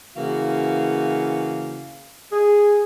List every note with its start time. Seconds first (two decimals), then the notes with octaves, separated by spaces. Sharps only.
0.16 C#3 E3 A#3 F#4 F5
2.32 G#4